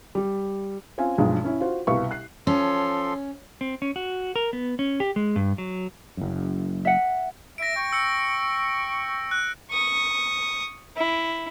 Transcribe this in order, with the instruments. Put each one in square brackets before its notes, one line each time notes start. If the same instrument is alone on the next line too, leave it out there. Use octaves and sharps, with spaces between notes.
[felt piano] G3
C4 C#4 F4 F5 G#5
B1 G2 B2 F3 G#3
C#4 E4
F4 F#4 C5
C2 B2 G3 B4 F5 C#6
F#6 C7
[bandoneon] F3 A4 C6 [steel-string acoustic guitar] C#4
[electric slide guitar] C4
C#4
F#4
A#4
B3
C#4
G4
G#3
G2
F#3
[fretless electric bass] F#1 F#2
[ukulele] E5 F#5
[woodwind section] E5 [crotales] A#6 D7
[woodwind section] G5 C#6
[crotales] E6 C#7
F#6
[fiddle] C#6 D#6
E4